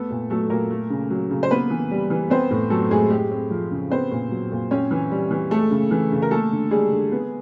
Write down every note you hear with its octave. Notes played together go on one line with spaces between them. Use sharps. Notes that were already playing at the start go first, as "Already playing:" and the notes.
Already playing: A3 B3 A4
A#2
F#3 A3 A4
A#2 A#3 A#4
A3
C#3
F#3
C#3
C5
A#3 B3 B4
E3
G3
E3
B3 C4 C5
A2
F#3 A3 A4
A2 G#3 G#4
G#3 G4
C4
F3
C#3
B3 C4 C5
A#2
F#3
A#2
C4 C#4 C#5
E3
G3
E3
G#3 A3 A4
C#3
E3
C#3
A#4
A3 A#3 A4
D3
G3 G#3 G#4
D3
B3